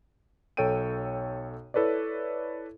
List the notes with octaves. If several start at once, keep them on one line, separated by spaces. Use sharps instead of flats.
B1 A4 C#5 G5 D7 D#7
E4 A4 B4 C#5 D5